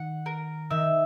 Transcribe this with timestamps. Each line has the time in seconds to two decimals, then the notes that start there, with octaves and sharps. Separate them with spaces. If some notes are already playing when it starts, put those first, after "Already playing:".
Already playing: D#3 F#5
0.26 A#4
0.70 D#3 E5